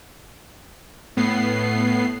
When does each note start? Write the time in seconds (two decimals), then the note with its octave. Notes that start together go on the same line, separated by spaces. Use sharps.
1.17 A2 B3 C7